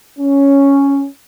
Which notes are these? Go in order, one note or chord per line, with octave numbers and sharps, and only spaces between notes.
C#4